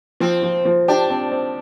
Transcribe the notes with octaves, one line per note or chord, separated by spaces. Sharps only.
F3 C4
F3
F3
D4 G4
C4
C4